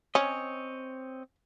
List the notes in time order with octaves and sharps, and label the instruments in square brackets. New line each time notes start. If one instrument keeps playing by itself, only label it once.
[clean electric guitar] C4 C#5 D#5 [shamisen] C#4